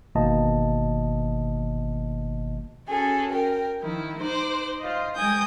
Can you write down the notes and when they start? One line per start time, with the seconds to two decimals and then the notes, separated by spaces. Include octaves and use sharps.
0.15 G1 B2 D#3 A#3 D#5 A5
2.88 C#4 F#4 G#4 A4
3.30 A#4 G5
3.81 D#3 F3 E4
4.21 D#4 C5 D6 F#6
4.79 F4 C5 D#5
5.16 G#3 G5 G#5 D#6 G6